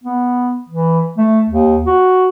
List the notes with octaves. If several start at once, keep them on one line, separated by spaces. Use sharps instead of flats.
B3
E3
A3
D#2
F#4